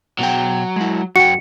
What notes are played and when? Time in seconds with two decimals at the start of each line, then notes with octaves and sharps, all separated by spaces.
0.19 B2 F#3 B3 G5
0.76 G#3 E4
1.16 F#2 F#4 G5 C#7